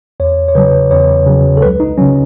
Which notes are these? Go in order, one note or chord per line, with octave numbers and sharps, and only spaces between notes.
E2 C#5
C#5
C#3 F#3 B4
E2 C#5
C#3 F#3
A4
C#2 B4
D#4
C#3 F#3 C#4